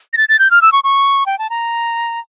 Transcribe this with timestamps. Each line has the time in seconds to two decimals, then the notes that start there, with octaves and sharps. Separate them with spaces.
0.13 A#6
0.17 A6
0.29 A6
0.39 G6
0.51 F6
0.62 E6
0.72 C#6
0.84 C#6
1.26 G5
1.39 A5
1.50 A#5